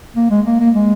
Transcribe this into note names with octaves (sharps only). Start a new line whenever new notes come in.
A#3
G#3
A#3
A#3
G#3